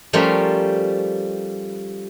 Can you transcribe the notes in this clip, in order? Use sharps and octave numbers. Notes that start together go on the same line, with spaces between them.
F3 G3 A3 C#4 A#4 C5